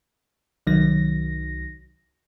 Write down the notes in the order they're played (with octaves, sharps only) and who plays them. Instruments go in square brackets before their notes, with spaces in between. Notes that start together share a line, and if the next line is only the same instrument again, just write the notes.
[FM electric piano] C2 D#3 F#3 A#6